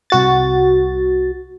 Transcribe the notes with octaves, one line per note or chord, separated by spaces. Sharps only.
C2 F#4 A6